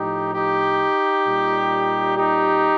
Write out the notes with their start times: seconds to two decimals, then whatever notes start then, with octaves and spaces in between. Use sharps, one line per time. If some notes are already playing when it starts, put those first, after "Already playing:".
Already playing: A2 F3 D#4 G4
0.33 D#4 G4
1.25 A#2 G3
2.17 D#4 G4